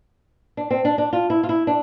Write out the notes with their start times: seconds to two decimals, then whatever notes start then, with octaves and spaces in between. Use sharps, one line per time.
0.57 D4
0.71 C4
0.85 D4
0.98 D4
1.13 F4
1.30 E4
1.43 F4
1.49 E4
1.67 D4